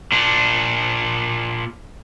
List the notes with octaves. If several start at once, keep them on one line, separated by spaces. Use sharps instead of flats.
A#2 D4